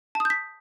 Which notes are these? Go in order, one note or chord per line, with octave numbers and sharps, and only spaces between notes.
A5 D#6 G6 B6